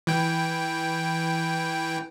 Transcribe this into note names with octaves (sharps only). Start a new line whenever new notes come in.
E3 G5